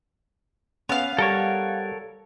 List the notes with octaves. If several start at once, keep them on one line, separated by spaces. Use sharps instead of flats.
B3 C#4 F5
G3 A4 A#4 C#5